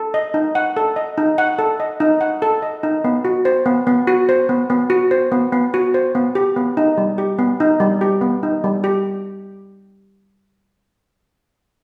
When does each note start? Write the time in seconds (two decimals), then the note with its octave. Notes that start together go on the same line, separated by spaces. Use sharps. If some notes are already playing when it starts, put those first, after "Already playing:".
Already playing: A4
0.14 D#5
0.34 D#4
0.55 F#5
0.77 A4
0.96 D#5
1.18 D#4
1.38 F#5
1.59 A4
1.80 D#5
2.00 D#4
2.21 F#5
2.42 A4
2.62 D#5
2.83 D#4
3.04 B3
3.25 F#4
3.45 C5
3.66 B3
3.87 B3
4.07 F#4
4.29 C5
4.49 B3
4.70 B3
4.90 F#4
5.11 C5
5.32 B3
5.53 B3
5.74 F#4
5.94 C5
6.15 B3
6.35 G4
6.56 B3
6.77 D#4
6.98 G3
7.18 G4
7.39 B3
7.60 D#4
7.80 G3
8.01 G4
8.21 B3
8.43 D#4
8.64 G3
8.84 G4